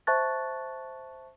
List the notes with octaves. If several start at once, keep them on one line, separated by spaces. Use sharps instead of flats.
C5 E5 A5 C#6 F#6 A6